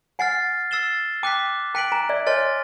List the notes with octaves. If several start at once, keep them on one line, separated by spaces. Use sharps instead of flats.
F#5 G#5 F6 A6 C7
E6 A6 C7 E7 G7
G5 A5 D6 F#6 B6
G5 A5 F#6 B6 D7 F#7
G#5 A#5
D5 E5
C#5 D#5 G#5 C6 F6 A6